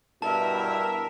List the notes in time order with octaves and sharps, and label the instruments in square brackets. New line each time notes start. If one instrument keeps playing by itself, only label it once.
[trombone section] G2 B2 E4 [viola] A#4 E5 [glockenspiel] A5